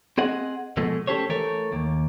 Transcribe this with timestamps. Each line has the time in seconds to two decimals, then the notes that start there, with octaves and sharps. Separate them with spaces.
0.18 C4 G#4 D#5 F#5
0.77 B2 F3 G#3 A3
1.07 C#4 G4 A4 C5 C#5
1.30 E3 A3 A4 A#4 C#5
1.72 D#2 A#3